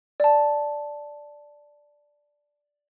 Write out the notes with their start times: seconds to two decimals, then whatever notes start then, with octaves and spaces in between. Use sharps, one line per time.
0.20 D5 A5